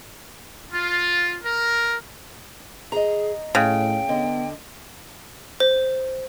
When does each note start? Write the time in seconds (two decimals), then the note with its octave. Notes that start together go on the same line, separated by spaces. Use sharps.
0.72 F4
1.44 A#4
2.92 G#4 D#5 A#5
3.55 A2 C#3 G5
4.09 D3 B3 D#5
5.60 C5